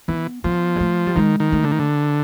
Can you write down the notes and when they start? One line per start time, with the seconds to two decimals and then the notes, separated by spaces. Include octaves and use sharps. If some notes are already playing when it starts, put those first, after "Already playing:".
0.08 E3 B3
0.44 F3 B3
0.76 G#3
0.80 A3
1.06 G3
1.15 D#3 G#3
1.40 D#3
1.52 A3
1.64 D3
1.71 D#3
1.79 D3